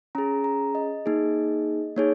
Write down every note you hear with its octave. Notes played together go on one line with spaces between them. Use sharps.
C#4 G#4 A#5
A#5
D#5
A#3 D#4 G#4
A#3 D#4 G#4 C#5